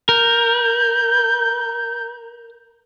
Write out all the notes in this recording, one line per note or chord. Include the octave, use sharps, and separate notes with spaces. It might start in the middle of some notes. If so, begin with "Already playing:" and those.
A#4 G6